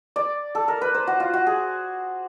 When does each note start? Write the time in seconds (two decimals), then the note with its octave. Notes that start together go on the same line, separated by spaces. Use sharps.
0.16 D5
0.55 A4
0.68 A#4
0.81 B4
0.94 C5
1.07 F#4
1.20 F4
1.34 F#4
1.47 G#4